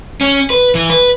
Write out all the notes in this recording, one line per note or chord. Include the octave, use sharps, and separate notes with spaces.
C#4
B4
E3
B4